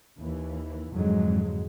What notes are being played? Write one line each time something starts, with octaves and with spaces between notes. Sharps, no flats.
D#2 E3
F2 G#2 D3 F#3 G#3